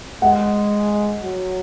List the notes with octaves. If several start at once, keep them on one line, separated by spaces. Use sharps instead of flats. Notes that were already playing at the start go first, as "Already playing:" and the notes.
G#3 F#5
F#3